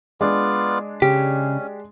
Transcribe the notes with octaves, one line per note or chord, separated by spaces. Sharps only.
G#3 B3 D4 F4 D5
C#3 C#4 G4